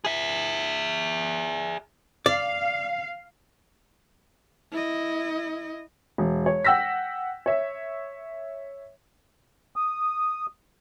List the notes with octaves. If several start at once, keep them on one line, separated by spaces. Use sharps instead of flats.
G#4 E5
D5 F5
E4 D#5
E1
C#5
F#5 G5 E6 A#6 B6
C#5 E5
D#6